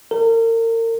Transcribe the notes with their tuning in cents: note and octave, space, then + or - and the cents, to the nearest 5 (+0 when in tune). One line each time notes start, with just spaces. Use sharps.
A#4 -35